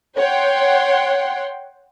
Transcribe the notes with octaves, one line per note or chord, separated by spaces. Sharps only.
C#5 F#5 G5 C6